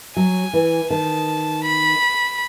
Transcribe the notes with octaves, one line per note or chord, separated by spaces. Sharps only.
F#3 G#5
E3
D#3 A5
B5